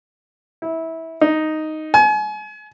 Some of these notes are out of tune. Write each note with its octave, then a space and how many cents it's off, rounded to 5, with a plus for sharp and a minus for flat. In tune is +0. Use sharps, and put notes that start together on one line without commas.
E4 -20
D#4 +0
G#5 +35